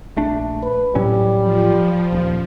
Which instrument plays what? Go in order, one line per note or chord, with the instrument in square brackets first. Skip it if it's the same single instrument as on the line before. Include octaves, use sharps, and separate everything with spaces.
[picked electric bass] A#1 A3 D4
[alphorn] B4
[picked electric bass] A2 F#3 C#4 [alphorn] G3
[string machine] F3
[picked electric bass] D#1